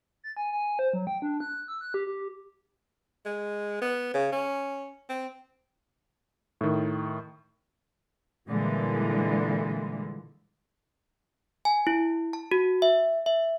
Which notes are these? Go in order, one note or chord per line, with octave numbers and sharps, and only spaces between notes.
A6
G#5
G#5
C5
F#3
G5
D4
F#6
E6
F#6
G4
G4
G#3
B3
C#3
C#4
C4
A2 D#3
A#2 D3 E3 G3 G#3
G#5
E4
A5
F#4
E5
E5